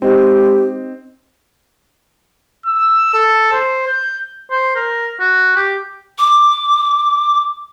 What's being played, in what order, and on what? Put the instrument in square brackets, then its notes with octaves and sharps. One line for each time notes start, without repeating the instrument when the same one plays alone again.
[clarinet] G#3 [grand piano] C4 D#4 [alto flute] G4
[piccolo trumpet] E6
A4
C5
G6
[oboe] C5
A#4
F#4
G4
[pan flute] D6